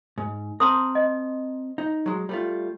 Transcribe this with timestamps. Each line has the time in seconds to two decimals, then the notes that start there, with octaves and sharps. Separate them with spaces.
0.18 G#2
0.60 C4 A#4 A5 C6 D#6
0.95 D#5
1.78 D#4
2.06 F#3 G#3
2.29 G3 A3 F4